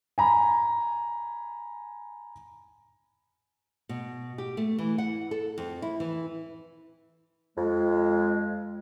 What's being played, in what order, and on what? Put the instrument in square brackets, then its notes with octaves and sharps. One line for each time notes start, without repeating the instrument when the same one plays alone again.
[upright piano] G#5 A#5 B5
[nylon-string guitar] B2
G4
A3
E3
F#5
A4
F2
E4
E3
[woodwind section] F2 G#3